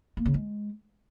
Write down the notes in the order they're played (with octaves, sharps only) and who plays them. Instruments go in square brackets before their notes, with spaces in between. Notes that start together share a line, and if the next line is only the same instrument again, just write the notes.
[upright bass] A#3
C#3
G#3